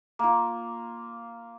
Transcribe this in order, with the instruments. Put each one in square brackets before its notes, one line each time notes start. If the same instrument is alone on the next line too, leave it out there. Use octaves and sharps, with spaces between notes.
[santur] A#3 F4